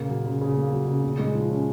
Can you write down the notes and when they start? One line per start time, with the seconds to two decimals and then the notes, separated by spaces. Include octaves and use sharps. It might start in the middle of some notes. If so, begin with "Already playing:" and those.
Already playing: A#2 C#3 A#3
0.09 F#3
0.26 C#3
0.41 C#3
0.57 A#3
0.73 F#3
0.88 C#3
1.04 A#2
1.19 G#3
1.35 F3
1.51 C#4